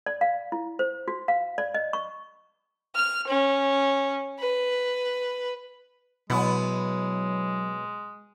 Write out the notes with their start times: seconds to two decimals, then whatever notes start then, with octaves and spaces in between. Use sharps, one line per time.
0.06 D5
0.21 F5
0.52 E4
0.79 C5
1.08 F#4
1.28 F5
1.58 D5
1.74 D#5
1.93 C#6
2.95 F6
3.27 C#4
4.39 B4
6.30 B2 F#3 G#3 B3 E4